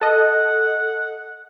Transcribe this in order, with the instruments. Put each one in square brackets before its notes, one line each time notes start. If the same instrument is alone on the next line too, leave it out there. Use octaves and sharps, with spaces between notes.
[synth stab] A4 D#5 [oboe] F#5